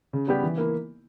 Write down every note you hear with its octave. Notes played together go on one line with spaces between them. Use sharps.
C#3
G3 B3 G4
E3
A#3 E4